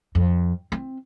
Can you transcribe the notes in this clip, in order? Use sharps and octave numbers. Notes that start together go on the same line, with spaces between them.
F2
C4